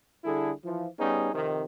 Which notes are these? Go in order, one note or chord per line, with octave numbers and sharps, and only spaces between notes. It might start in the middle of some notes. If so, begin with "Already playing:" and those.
D3 G3 E4 G#4 A4
E3 F3
G3 B3 C#4 D#4 G#4
F2 C3 D#3